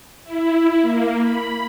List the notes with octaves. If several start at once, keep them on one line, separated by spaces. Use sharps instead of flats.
E4
A#3
B5